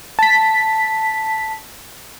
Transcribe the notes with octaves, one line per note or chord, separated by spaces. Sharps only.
A5 B6